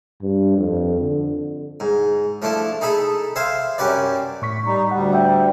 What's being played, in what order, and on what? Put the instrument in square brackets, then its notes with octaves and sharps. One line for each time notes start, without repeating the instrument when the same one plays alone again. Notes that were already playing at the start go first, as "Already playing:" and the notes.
[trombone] G2
F2
D3
[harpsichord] G#2
F3 A3 D4 E4
D#4 G#4 A4 B5
C5 E5 F5 G#5
F#2 C#4 G4 B4 D5
[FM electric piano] A2 C#6 B6
[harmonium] G3 D#4
[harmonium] D2 G3 [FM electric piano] F#5
[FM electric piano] D5 E5 G5